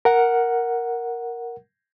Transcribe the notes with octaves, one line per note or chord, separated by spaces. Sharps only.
A#4 F#5